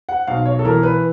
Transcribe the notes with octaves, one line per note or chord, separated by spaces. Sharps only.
F#5
B1 F5
C#5
A4
E3 A#4
B4